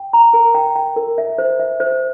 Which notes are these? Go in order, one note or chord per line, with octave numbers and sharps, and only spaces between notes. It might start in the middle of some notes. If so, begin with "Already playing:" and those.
Already playing: G5
A#5
A#4
G5
G5
A#4
E5
C5
E5
C5